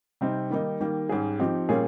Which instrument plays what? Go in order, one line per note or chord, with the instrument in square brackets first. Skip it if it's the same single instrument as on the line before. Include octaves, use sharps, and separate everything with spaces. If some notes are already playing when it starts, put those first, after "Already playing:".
[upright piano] C3 G3 C4 D#4
D#3 G3 A#3 D#4
D#3 G3 A#3
G#2 G3 C#4 G#4
F3 C4 D#4 G4
A#2 G3 C#4 F4 G#4